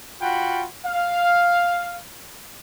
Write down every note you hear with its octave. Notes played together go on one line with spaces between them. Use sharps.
F4 F#4 F#5 G5 B5
F5